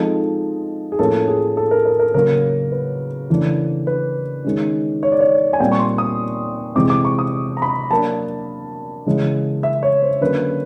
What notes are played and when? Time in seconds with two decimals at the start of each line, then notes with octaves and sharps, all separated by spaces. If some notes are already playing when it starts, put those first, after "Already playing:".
Already playing: F3 G#3 C4 D#4 A4
0.92 G#4
0.99 A2 F3 A#3 C#4 A4
1.28 G#4
1.57 A4
1.71 A#4
1.85 A#4
1.99 A#4
2.14 C#3 F#3 A#3 A#4
2.72 B4
3.30 C#3 E3 A3 D4
3.87 B4
4.44 D#3 G#3 C#4
5.03 C#5
5.12 D5
5.20 C#5
5.53 G#5
5.60 A#2 G3 C4 G5
5.72 C#6
5.79 C6
5.98 D#6
6.75 C3 E3 G#3 C4 D6
6.90 D6
7.05 C#6
7.19 D#6
7.57 A#5
7.62 B5
7.91 F#3 A#3 D4 A5
9.06 C#3 E3 G#3
9.63 E5
9.83 C#5
10.02 C5
10.21 D3 F#3 A#3 C#4 B4